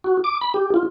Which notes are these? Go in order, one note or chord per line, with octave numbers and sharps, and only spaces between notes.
F#4
D6
B5
G4
F4